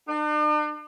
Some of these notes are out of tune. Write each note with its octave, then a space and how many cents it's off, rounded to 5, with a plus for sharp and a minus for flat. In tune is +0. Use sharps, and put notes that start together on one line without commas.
D4 +45